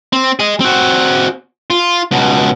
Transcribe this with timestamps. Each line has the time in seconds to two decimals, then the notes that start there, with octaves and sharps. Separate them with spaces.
0.13 C4
0.39 G#4 D#5
0.60 C4 F#4
1.70 F4
2.11 C#2 B2